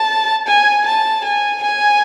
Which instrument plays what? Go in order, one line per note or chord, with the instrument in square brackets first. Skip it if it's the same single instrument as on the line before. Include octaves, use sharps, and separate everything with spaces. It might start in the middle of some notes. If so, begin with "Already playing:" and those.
Already playing: [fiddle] A5
G#5
A5
G#5
G#5